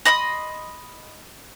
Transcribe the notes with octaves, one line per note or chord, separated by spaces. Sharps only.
D#5 B5 C6 D#6